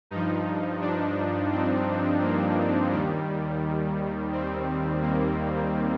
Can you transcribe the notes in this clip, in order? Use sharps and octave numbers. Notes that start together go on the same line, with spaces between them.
G2 F3 D#4
D4
C4
A#3
D#2 D#3 G3
C4
A#3